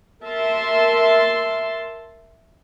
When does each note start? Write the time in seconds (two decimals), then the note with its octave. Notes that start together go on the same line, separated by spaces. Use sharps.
0.22 A#4 E5 A5 C6